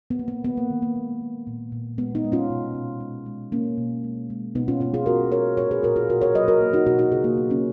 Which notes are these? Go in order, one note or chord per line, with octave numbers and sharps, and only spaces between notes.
B3
A#3
B3
D#3 B3
A#3
D#3
A#3
G#3
G#3
A#2
A#2
G#3 B3
B3 D#4
G#3
C#4 F4
B2
B2
G#3
G#3
B2 A#3 C#4
B2
G#3
G#3
B2 B3 D#4
C#4 F4
B2 C#4 F4
F4 G#4
G#3 F#4 A#4
G#3 A#4 C#5
A#2 A#4 C#5
G#4 B4
A#2 F#4 A#4
F4 G#4
B2 F#4 A#4
A#4 C#5
F#3 B4 D#5
F#4 A#4
A#3
D#4 F#4
B2 D#4 F#4
D#4 F#4
C#3 F4 G#4
A#3
F#3 B3
A#3 C#4